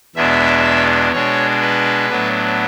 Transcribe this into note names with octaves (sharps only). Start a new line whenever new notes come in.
E2 B2 G#3 B3 D4 E5
B2 G#3 D4 C#5
B4
A2 F#3 B3 D4